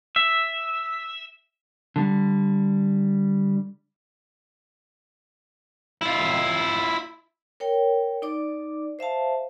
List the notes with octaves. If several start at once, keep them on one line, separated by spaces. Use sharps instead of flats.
E5
D3 G3
E4 F4
A#4 C#5 G5
D#4 D5 D6
C5 E5 F5 A5